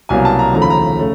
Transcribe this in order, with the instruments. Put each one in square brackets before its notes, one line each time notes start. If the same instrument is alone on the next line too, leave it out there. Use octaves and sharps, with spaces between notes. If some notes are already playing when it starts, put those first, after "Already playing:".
[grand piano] C2 B2 F#3 A#3 G#5
A5
A#5
D#2 C#3 F3 A3 A#5
B5
A#5
C#3 A3